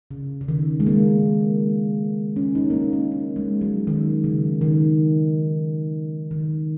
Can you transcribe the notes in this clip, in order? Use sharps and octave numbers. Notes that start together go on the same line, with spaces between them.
C#3
C#3
D#3
G#3
A#3
C#4
D#4
A#3
C#4
C#4
C#4
D#4
G#3
F#3
D#3
C#3
D#3
D#3